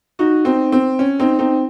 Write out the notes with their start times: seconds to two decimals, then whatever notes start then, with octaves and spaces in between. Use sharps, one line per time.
0.19 D#4 F#4
0.45 C4 D#4
0.72 C4
0.99 C#4
1.19 C4 D#4
1.39 C4 D#4